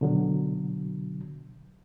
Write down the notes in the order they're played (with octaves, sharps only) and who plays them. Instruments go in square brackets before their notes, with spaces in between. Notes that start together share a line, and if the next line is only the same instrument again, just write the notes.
[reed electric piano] B2 D3 F#3